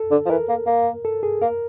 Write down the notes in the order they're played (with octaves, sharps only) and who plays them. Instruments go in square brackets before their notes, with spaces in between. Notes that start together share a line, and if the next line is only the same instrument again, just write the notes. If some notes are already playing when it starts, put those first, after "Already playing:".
Already playing: [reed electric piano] A4
[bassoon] D3
F3
[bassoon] E3 [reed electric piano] A#4
[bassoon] A#3
A#3
[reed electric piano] A4
G#4
[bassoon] A#3 [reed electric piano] A#4